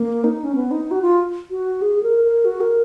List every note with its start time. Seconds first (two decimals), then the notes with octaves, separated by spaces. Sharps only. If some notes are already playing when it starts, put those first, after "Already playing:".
Already playing: A#3
0.24 D#4
0.44 C#4
0.55 B3
0.71 D#4
0.91 F#4
1.02 F4
1.51 F#4
1.82 G#4
2.03 A#4
2.24 A#4
2.45 F#4
2.61 A#4